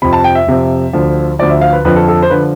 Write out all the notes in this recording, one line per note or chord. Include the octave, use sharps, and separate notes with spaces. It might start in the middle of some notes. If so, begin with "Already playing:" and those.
F2 C3 F3 B5
A5
G5
E5
F2 C3 F3
D2 D3 F3
D2 D3 F3 D5
E5
F5
B4
F2 D3 F3 B4
A4
A4
C5
D3 F3 B4